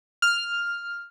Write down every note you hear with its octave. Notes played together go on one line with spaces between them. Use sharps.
F6